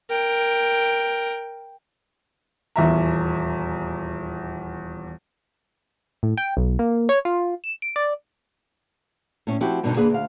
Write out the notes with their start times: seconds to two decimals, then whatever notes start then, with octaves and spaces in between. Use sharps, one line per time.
0.10 A#4 G5
2.76 D#1 E2 E5 A#5
6.23 A2
6.38 G5
6.57 B1
6.79 A#3
7.09 C#5
7.25 F4
7.64 E7
7.82 D7
7.96 D5
9.47 A2 C#4
9.61 F3 C4 E4 F#4 G4
9.83 G2 B2 D3 D#3 B3 D#4
9.96 D3 A#3 G#4 B4
10.10 D2 F5